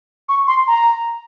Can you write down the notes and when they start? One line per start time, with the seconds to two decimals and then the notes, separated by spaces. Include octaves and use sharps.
0.29 C#6
0.47 C6
0.67 A#5